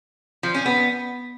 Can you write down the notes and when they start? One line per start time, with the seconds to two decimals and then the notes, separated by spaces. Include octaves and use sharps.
0.43 F3
0.54 C#4
0.66 B3